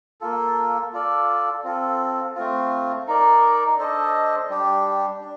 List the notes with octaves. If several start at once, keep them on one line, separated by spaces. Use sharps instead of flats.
A#3 F4 A4
F4 A4 D5
C4 F4 A4
A3 C4 F4
D#4 A#4 D5
D4 A4 C5 D#5
G3 D4 G4
D4